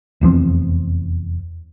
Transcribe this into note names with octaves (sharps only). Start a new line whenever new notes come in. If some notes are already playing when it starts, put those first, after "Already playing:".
F1 E2 F3 C4